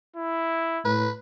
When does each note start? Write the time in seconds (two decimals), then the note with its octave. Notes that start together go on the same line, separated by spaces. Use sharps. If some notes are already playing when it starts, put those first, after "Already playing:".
0.16 E4
0.85 A2 B4